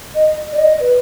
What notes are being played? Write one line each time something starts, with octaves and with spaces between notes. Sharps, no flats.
D#5
D5
D#5
B4